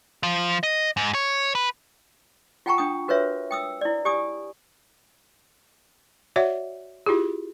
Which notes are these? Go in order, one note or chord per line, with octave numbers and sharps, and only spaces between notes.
F3
D#5
G#2
C#5
B4
F4 F#5 G5 A5 A#5 C#6
D4 G5 D#6
F#4 A#4 B4 C#5 E5
G5 D#6 E6
E4 D5
G4 D5 G#5 D#6
F#4 C#5 D5 E5 F#5
E4 F4 G4 G#4